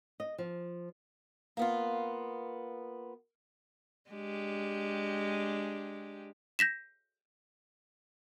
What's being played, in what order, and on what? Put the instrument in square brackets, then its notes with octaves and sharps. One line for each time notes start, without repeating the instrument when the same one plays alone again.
[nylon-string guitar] D#5
F3
[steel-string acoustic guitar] A#3 B3 F4
[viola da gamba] G#3 D4 G4
[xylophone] G6 A#6 B6 E7